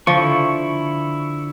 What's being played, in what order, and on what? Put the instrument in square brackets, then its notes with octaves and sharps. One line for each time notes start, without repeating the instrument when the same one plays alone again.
[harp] D3 [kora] F3 [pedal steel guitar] E4 C#6